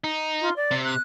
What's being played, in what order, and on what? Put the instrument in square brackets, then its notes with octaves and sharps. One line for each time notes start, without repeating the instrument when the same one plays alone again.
[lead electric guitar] D#4
[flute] F4
D5
[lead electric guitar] C3
[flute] F#6